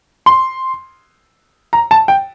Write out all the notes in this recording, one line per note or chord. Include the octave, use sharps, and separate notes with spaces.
C6
A#5
A5
G5